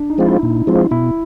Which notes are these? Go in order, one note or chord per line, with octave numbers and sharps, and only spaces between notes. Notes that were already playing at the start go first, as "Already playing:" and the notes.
Already playing: D4
D#4
F3 G#3 C4 F4
E4
A#2
F3 G#3 C4 F4
B2 E4